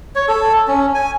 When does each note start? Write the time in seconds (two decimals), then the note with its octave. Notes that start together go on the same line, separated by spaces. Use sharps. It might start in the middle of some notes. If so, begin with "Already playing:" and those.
0.15 C#5
0.28 A4
0.68 C#4
0.95 G#5